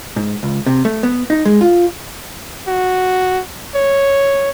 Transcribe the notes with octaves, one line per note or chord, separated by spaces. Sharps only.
G#2
C#2
C3
A3
B3
D#4
G#3
F4
F#4
C#5